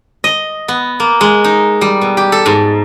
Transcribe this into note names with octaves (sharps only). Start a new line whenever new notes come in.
D#5
B3
A#3
G#3
D#4
G3
B2
G4
A4
G#2